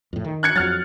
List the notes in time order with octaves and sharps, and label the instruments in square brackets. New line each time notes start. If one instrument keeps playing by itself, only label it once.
[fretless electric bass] F2 A2
D#3
[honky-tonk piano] F#6 G#6 C#7
[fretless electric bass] F2 F#3 [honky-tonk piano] F6 A6